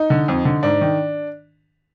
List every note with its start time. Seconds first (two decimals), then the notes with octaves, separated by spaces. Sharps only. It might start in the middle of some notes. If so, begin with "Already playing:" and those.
Already playing: D#4
0.10 D3
0.28 F2
0.45 D3
0.63 G#2 D4
0.81 D#3